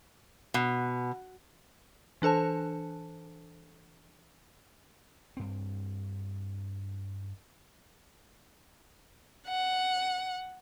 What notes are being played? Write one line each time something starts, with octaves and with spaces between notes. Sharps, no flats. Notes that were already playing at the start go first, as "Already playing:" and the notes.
B2
E3 D4 A4 C5 A5
G2 C4
F#5